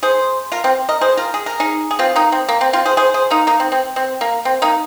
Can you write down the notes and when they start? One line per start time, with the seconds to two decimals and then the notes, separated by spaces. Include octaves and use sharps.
0.03 G#4 C5
0.52 F4 A#4
0.64 C4
0.89 A#4 D#5
1.01 G#4 C5
1.17 F4 A#4
1.34 G#4
1.46 A#4
1.60 D#4 G#4
1.91 G#4
1.99 C4 F4
2.16 A#3 D#4
2.32 C4
2.49 A#3
2.61 C4
2.73 C4 F4
2.85 G#4 C5
2.97 G#4 C5
3.14 G#4 C5
3.30 A#3 D#4
3.47 A#3 D#4
3.60 C4
3.72 C4
3.96 C4
4.21 A#3
4.45 C4
4.62 A#3 D#4